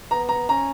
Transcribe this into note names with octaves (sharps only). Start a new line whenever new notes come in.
B3 A#5
A#5
C#4 A#5